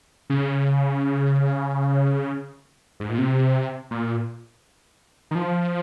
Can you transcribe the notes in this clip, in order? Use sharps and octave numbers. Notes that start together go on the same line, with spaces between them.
C#3
G#2
A#2
C3
A#2
D#3
F3